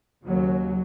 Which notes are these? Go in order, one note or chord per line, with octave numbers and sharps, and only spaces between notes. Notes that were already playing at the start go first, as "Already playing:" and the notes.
D#2 C#3 F#3